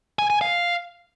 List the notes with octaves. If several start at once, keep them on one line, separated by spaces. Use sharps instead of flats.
G#5
G#5
F5